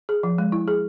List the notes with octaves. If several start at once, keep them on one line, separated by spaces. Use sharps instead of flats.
G#4
F3
G#3
E4
G#4